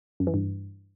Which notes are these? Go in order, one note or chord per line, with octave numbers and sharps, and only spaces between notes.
F#2
E3
G2